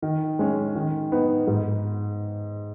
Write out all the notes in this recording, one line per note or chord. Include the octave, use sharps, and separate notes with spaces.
D#3
G#3 C#4
D#3
B3 D#4
G#2